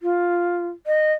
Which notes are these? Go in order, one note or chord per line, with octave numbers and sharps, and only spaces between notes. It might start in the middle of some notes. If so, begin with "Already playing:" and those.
F4
D#5